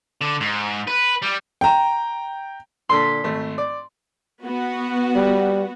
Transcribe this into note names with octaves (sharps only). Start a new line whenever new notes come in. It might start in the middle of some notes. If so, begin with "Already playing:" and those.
D3
G#2
B4
G3
G5 A#5
A#2 D3 A4 C6 B6
G#1 A3
D5
B3 F#4
G3